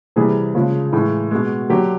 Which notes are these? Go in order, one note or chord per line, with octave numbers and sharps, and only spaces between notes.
C3 E3 G3 G#4
C#3 F3 G#3
A2 E3 G#3
B2 G#3
D3 F#3 G4